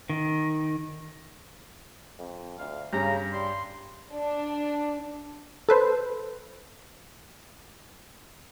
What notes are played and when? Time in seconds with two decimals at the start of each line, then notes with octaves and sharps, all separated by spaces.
0.10 D#3
2.19 F2
2.59 D2 F5
2.93 G2 C#3 A#5
3.33 G3 C6
4.13 D4
5.69 A4 B4 C5